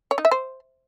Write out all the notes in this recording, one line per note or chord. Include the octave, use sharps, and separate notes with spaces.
C#5
D#4
E5
C5